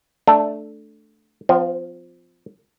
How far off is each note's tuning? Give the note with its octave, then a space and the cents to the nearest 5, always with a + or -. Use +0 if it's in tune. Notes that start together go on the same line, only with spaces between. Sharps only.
A3 +0 D4 +5
F3 +0 C4 -45